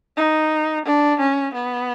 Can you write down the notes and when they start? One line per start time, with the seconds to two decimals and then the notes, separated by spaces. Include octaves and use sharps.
0.17 D#4
0.85 D4
1.19 C#4
1.54 B3